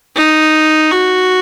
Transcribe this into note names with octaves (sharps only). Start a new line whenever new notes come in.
D#4
F#4